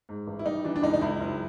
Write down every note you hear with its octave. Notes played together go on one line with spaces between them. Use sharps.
G#2
A1
E4
G3 D#4
E3 D4
D4
C#2 D#4
D#4
C#2 E4
F#1